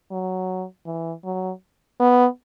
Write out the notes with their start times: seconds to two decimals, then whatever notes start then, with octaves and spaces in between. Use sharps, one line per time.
0.11 F#3
0.86 E3
1.24 F#3
2.00 B3